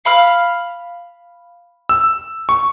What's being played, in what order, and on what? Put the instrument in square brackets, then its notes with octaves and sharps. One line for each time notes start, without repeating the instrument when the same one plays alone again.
[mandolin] F5 B5 F6
[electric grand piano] E6
C#6